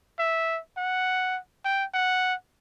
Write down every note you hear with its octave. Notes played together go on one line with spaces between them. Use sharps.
E5
F#5
G5
F#5